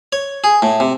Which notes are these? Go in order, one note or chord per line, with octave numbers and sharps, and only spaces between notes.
C#5
G#4
A2
C3